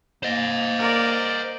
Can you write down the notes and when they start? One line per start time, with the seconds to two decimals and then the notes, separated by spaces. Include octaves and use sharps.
0.23 A#3 C5 D#5
0.79 A#4 D5